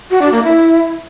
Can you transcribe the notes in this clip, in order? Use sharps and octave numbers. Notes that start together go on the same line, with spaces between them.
F#4
D4
A#3
E4